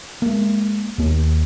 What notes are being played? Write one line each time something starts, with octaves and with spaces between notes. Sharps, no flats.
G#3 A#3
D#2 A#3